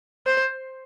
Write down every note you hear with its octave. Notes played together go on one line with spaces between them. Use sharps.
C5